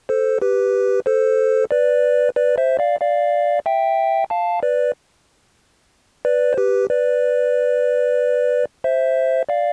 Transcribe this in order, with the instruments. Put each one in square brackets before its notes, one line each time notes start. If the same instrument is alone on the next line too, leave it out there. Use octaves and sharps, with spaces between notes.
[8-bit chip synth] A4 C5
G4 B4
A4 C5
B4 D5
B4 D5
C5 E5
D5 F5
D5 F5
E5 G5
F5 A5
B4 D5
B4 D5
C5
G4 B4
B4 D5
C5 E5
D5 F5